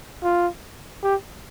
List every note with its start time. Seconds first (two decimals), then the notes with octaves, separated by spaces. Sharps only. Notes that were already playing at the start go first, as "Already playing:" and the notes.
0.23 F4
1.03 G4